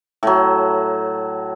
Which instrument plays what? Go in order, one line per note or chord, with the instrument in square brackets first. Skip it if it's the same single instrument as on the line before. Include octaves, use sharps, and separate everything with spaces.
[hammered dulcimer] A2 F#3